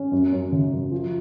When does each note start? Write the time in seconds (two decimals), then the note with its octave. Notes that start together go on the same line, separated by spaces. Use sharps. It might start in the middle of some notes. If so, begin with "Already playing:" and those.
Already playing: C#4
0.12 F#2
0.32 F#2
0.52 C#3
0.72 F#2
0.92 F3